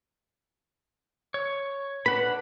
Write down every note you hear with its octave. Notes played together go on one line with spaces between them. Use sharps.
C#5
D4 B4 F#5 B5